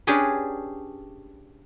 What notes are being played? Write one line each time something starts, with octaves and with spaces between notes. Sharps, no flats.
C#4 D4 G4 G#4 B4